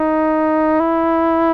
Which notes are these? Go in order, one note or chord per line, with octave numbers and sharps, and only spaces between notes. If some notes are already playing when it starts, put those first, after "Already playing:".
Already playing: D#4
E4